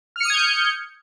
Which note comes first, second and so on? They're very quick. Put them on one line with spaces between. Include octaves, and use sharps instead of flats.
F6 C#7 D#6 G#6 G6